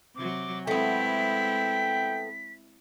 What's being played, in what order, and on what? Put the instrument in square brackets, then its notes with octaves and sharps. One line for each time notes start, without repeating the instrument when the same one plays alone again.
[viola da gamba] C3 F#3 [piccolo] D6
[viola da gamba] G#3 C4 E4 [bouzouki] A3 B3 [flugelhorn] G5 [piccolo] B6